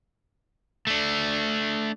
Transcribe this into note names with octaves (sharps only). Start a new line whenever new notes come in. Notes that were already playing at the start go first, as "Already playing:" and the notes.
A3 D4